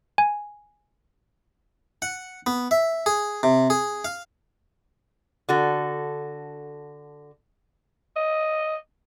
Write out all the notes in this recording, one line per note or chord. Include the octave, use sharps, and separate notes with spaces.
G#5
F#5
B3
E5
G#4
C3
G#4
F5
D3 F#4 A4
D#5